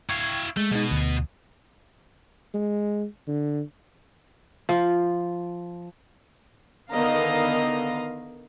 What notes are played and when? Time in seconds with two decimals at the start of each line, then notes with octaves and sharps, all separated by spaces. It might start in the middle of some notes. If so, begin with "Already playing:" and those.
0.09 E4 F5 G5 C#6 G#6
0.57 G#3 A3
0.71 B2 G#3 D#4
0.91 D2
2.54 G#3
3.28 D3
4.69 F3
6.93 D3 D#3 B3 D#5 F5 A#5